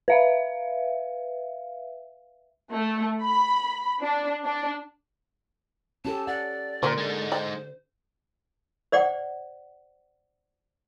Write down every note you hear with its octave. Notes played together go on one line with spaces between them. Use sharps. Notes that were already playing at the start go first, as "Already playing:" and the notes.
B4 E5 F5
A3
B5
D4
D4
C#4 G4 A4 A5
D5 F#5
A#2 D3 A#3 C5
G#3 D#4
C5 D5 G5
C5 D5 F#5 G5